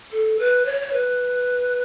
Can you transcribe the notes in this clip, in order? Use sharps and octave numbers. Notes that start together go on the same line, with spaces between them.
A4
B4
C#5
C#5
B4